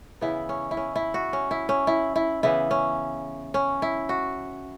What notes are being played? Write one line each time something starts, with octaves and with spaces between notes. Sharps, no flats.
C#3 E3 B3 E4
C#4
E4
C#4
E4
F#4
C#4
E4
C#4
E4
E4
C#3 E3 B3 E4
C#4
C#4
E4
F#4